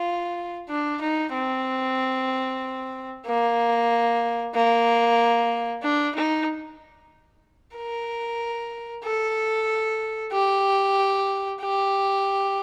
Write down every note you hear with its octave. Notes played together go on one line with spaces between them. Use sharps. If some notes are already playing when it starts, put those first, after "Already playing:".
Already playing: F4
D4
D#4
C4
A#3
A#3
D4
D#4
A#4
A4
G4
G4